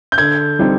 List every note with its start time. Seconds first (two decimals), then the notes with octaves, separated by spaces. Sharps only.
0.12 G6
0.18 D3 G#6
0.59 G3 C4 D#4